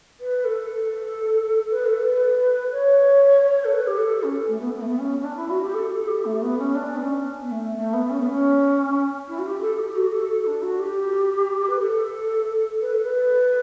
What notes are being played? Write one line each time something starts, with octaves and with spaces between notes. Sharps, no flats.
B4
A4
A4
B4
A4
B4
C#5
A4
B4
G4
A4
C#4
A3
B3
B3
A3
B3
C#4
C#4
D4
E4
F#4
G4
A4
A4
G4
A3
B3
C#4
D4
B3
C#4
B3
A3
A3
B3
C#4
B3
C#4
E4
F#4
G4
A4
G4
F#4
A4
A4
D4
F#4
G4
B4
A4
B4
A4
B4